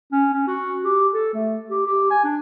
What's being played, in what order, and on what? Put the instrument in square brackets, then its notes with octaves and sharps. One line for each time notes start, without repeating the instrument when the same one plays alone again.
[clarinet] C#4
C#4
F#4
G4
A4
A3
G4
G4
G#5
D4